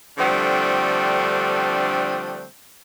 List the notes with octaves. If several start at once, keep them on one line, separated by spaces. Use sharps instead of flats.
D3 F3 G3 A3 C4 D4